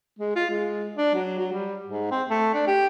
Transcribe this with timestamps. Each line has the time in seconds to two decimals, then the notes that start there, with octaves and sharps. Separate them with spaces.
0.19 G#3
0.36 F4
0.50 G#3
0.96 D4
1.14 F#3
1.39 F#3
1.52 G3
1.87 G#2
2.11 C4
2.29 A3
2.54 D4
2.67 G4